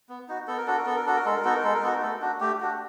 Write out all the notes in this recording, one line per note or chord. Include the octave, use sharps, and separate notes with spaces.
B3
D#4 F#4
B3 A4
A#4
D4 F#4 A4
A#4
B3 A4
A#4
D4 F#4 A4
A#4
G#3 A4
A#4
B3 D#4 F#4 A4
A#4
G#3 A4
A#4
B3 D#4 F#4 A4
A3 A4
D4 F#4
A3 G4
D4 F#4